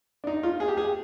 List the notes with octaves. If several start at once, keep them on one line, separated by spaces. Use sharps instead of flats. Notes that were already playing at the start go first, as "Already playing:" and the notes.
D4
D#4
F4
G#4
G4
G#4